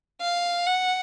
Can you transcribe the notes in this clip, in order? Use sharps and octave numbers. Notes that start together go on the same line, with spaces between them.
F5
F#5